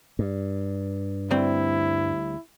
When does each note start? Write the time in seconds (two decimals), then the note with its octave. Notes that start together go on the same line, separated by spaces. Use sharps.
0.19 G2
1.31 D2 G3 C4 E4